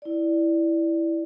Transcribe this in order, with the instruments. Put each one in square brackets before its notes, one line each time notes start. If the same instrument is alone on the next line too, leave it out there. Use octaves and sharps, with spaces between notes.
[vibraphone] E4 D5